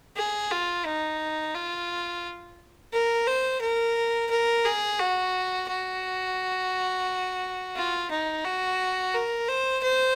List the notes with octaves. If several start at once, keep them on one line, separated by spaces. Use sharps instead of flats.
G#4
F4
D#4
F4
A#4
C5
A#4
A#4
G#4
F#4
F#4
F4
D#4
F#4
A#4
C5
C5